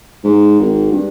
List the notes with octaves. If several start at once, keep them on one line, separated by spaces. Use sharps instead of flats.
G#2
G#1
G2